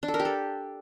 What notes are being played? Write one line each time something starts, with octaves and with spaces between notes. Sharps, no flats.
D4
A4
A#4
G4
A4